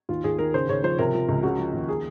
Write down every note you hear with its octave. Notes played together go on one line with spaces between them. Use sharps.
D#2 F4
D#2 G#4
D#3 A#4
C#3 C5
C#3 C#5
F3 C5
C3 A#4
F3
C#2
C#3 F#4
F3
D#2
G#4